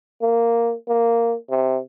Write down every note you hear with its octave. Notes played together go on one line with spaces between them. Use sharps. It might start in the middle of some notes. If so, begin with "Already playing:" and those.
A#3
A#3
C3